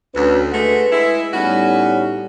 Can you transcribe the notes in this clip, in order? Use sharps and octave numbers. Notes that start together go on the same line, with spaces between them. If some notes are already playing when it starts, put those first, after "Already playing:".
D2 C#4 F#4 B4
G#3 A3 F#4 B4
G#3 E4
A2 G3 B3 C#4 D#4 F#4